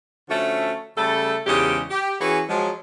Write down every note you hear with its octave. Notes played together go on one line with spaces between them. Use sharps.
D3 F3 A3 C#4 F#4 E5
C#3 G3 A3 A4
E2 G#2 C#3 G#3 G4 D#5
G4
E3 C#4 E4 F#4 G#4 B4
F3 F#3 G#3